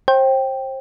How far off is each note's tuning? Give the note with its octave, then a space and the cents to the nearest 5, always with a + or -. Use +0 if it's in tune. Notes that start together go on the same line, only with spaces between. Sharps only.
C5 +30 G5 +0